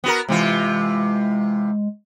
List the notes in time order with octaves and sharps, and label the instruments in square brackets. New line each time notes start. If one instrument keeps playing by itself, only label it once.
[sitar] B3 F#4 A#4
[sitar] C3 E3 F4 [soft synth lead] G#3